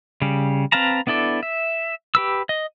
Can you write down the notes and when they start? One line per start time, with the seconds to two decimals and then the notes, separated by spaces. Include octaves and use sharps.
0.22 C#3 G3
0.72 C4 B4 F5 A5 A#5
1.07 B3 D4 E4 A4 D5
1.43 E5
2.15 G4 B4 E6
2.49 D#5